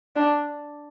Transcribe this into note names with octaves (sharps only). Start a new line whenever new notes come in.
D4